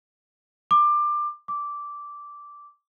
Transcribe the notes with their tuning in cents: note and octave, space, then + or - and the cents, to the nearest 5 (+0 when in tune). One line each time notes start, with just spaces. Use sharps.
D6 +20
D6 -10